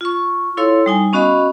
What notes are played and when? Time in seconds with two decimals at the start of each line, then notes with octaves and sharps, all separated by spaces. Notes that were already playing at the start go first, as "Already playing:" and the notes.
0.01 F4 C#6
0.57 E4 A4 C#5 F5 C6 E6
0.86 G3 D#4 G#5
1.13 B3 C#4 F#4 D#5 F5 B5